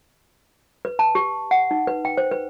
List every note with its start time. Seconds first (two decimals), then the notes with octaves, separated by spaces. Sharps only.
0.85 B4
0.99 A5
1.15 G4
1.51 F#5
1.71 D#4
1.87 B4
2.05 G5
2.18 C5
2.31 B4